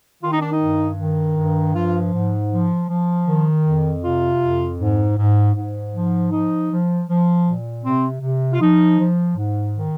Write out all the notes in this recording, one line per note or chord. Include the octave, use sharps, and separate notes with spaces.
D#3 F4
D#4
D4
D#4
G2
D#3
G2
F3 F4
G#2
F3
F3
D#3
F2
C3 F4
F2
G#2
G#2
G#2
F3
F3 D#4
F3
F3
A#2
C3 C4
C3
F4
F3 D#4
F3
G#2
D#3